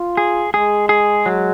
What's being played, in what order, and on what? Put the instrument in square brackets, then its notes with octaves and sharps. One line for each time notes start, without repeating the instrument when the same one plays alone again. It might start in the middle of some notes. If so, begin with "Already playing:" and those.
Already playing: [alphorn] F4
[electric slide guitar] G#4
[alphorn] G#3 [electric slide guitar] G#4
[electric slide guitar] G#4
F#3